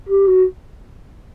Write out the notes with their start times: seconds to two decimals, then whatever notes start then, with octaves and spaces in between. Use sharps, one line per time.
0.09 G4
0.28 F#4